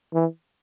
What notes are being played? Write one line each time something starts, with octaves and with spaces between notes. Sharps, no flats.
E3